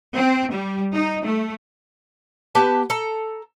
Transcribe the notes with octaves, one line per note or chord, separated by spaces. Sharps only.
C4
G3
D#4
A3
B3 G4 B4 A5
A4 A#5